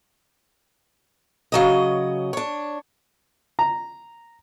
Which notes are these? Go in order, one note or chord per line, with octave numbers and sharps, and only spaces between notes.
C#3 F#3 D#5
D4 C#5
A#5